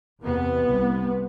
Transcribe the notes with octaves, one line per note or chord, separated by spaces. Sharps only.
E2 C3 B3
C2 C3